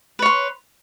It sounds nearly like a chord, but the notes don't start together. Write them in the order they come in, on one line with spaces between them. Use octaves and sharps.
B4 C#5 C6